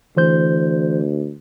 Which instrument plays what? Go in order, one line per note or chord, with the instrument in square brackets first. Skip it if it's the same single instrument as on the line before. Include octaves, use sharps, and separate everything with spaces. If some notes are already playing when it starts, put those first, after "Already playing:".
[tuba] D2 [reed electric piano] E3 C5 G6